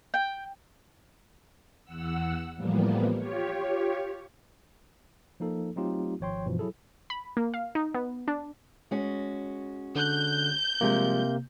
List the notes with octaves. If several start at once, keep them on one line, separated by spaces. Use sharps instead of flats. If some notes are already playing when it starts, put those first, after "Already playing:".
G5
E2 F#5 E6
A2 E3 F3 G3 A#3 B3
F4 G4 C#5
F3 A#3 D#4 A4
F#3 A3 C4 D#4 F4 G4
G#1 F3 C#5 G5 C6
G2 B2 E3 F3
F#3 E4 G#4 A4
B5
A#3
F5
D#4
B3
D4
G#3 C#4 F#4
D3 F#6 G6
C3 F3 G3 G#3 A#3